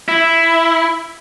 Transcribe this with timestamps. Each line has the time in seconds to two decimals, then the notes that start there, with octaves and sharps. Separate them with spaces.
0.08 E4